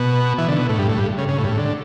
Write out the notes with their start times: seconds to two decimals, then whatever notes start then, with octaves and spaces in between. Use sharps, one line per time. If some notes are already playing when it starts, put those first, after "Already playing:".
Already playing: B2
0.38 E3
0.48 D3
0.58 B2
0.69 A2
0.79 G2
0.89 A2
0.98 G2
1.18 C#3
1.29 C#3
1.38 A2
1.44 G2
1.49 A2
1.58 D3